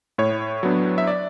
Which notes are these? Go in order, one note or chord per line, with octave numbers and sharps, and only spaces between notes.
A2 C#5
F#3 B3 D4
E5
D5